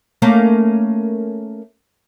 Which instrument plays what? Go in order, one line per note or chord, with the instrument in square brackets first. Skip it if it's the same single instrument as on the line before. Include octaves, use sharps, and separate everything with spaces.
[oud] A3 A#3 C#4